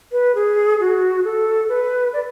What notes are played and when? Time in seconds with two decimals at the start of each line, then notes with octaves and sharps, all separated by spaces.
0.12 B4
0.35 G#4
0.80 F#4
1.24 A4
1.69 B4
2.13 D5